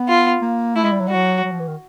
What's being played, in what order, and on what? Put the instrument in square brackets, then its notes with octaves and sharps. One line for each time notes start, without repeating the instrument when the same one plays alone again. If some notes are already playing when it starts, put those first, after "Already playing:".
Already playing: [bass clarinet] B3
[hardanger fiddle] F4
[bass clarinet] A#3
[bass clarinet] A3 [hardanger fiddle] E4
[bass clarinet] G#3
G3
F#3
[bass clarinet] G3 [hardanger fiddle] F#4
[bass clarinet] F#3
F#3
F3
E3
D#3